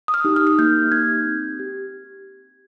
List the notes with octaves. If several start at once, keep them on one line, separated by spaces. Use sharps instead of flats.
D#6
F6
D#4 G4
F6
F6
A#3 G6
D#4 G4 G#6
C4
G4